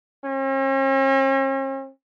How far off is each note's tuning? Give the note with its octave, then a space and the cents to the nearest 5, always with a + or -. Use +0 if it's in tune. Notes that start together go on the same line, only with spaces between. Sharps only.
C#4 -45